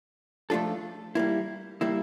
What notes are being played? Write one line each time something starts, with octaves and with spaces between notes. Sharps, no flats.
F3 A3 D4 F4 A4
G3 A#3 E4
G3 A#3 E4